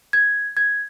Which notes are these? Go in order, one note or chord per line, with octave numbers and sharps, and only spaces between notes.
G#6
G#6